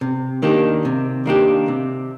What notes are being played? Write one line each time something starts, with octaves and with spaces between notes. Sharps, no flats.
C3
D#3 A#3 D4 G4
C3
D#3 A#3 D4 G4
C3